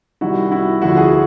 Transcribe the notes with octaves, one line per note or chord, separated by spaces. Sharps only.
C2 C3 D#3 E4 F#4
E4 F#4
D2 D3 F3 E4 F#4
F#4 G#4